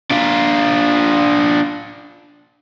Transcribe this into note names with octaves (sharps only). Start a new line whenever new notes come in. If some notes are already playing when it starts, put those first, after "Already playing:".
D4 F4